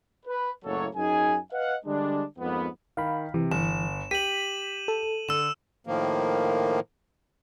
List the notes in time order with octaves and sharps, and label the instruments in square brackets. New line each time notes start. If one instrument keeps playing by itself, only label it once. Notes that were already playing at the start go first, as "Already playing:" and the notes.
[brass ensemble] B4
F#1 A2 F#3 A#3 A4 C#5
F#2 D#4 G#4 G#5
B4 D#5 F5 F#5
D3 G3 G#3 D4
F2 G#2 A#3 B3
[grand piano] D#3 [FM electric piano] F5 B5
[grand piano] C3 [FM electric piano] E3
[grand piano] G1 [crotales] E7
[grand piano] G4 [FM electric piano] B6 [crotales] D#7 F#7
[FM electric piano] A4
[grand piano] D3 [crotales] E6 E7
[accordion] A2 D#3 F3 A#3